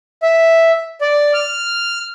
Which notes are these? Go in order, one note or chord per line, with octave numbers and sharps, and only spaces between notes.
E5
D5
F6